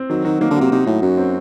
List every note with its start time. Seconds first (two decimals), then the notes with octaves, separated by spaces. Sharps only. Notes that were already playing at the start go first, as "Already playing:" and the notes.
Already playing: C4
0.10 D#3 F#3
0.25 D#3 F#4
0.41 D#3 A#3
0.50 D3
0.56 C3 F#4
0.72 C3 D#4
0.86 A2 F#3
1.02 F#2 F#4
1.17 C4